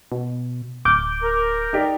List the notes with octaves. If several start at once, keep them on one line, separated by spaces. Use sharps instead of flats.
B2
D1 D6 F6 G6
A#4
D#4 G4 D5